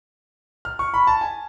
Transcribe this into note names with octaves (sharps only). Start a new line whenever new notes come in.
F6
C#6
B5
A5
G#5